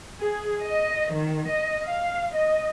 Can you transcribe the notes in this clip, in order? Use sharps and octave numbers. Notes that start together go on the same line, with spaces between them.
G#4
D#5
D#3
D#5
F5
D#5